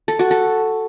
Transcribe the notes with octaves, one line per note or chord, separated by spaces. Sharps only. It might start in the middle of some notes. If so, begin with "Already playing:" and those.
A4
F#4
A4